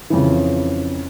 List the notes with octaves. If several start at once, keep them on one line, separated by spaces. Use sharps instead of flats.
F2 C#3 E3